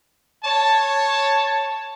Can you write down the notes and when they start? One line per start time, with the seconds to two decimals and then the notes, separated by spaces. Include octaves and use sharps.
0.44 C#5 A5